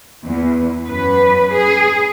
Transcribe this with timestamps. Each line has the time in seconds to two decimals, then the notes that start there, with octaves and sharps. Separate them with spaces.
0.24 E2
0.86 F#2 B4
1.51 G#4